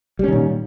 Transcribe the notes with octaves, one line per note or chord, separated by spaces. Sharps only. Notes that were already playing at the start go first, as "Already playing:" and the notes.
A#2 D#3 G3 C#4